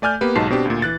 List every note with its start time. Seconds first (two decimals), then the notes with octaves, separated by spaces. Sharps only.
0.02 A3 D5 G#5 F6 G6
0.21 A#3 B3 G4 B4
0.35 B1 G#2 D#4 F#4 A5 C7
0.50 B2 C4 D4 G4
0.66 D2 A#2
0.82 E3 F#6 A6